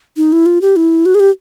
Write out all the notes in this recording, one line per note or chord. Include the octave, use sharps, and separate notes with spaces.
D#4
E4
F4
G4
E4
F#4
G#4
G4